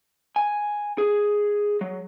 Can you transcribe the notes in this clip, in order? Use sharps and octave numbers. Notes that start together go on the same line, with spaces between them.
G#5
G#4
F#3